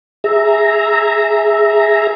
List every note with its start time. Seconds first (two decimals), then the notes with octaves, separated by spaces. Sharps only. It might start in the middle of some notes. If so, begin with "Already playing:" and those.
0.24 G#4 E5 A#5